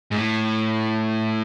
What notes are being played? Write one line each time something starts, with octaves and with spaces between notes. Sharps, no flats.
G#2
A2